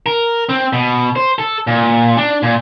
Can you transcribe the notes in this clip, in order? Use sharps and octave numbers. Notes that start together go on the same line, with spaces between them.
A#4
C4
B2
C5
A4
A#2
D4
A#2